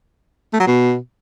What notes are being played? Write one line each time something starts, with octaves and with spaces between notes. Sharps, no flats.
A3
F#3
B2